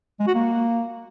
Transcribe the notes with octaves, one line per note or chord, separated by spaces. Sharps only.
G#3
F#4
A#3